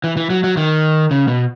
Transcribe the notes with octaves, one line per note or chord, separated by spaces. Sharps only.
E3
E3
F#3
F#3
D#3
C#3
B2